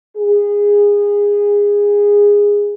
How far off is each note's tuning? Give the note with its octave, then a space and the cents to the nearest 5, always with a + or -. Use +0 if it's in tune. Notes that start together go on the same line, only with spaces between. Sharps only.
G#4 -20